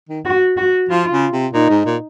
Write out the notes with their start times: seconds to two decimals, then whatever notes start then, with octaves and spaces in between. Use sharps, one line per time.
0.09 D#3
0.25 F#4
0.57 F#4
0.89 F3 F4
1.11 C#3
1.32 C3
1.53 A#2 D#4
1.70 G#2
1.85 A#2